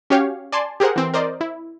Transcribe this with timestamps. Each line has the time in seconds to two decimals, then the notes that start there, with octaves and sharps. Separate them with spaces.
0.10 C#4 F#4 G4 C#5 F5 G5
0.52 D5 G#5 A5 C6
0.80 G4 G#4 A#4 C5 F#5
0.96 E3 C4
1.14 A#4 C5 D5 D#5
1.41 E4